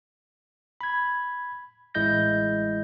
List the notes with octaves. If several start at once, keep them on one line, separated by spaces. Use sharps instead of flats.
B5 G#6
A1 G#3 E4 D#5 G6 A#6